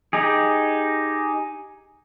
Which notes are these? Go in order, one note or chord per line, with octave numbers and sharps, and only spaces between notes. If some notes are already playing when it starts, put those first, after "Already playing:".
D#4 G4 G#4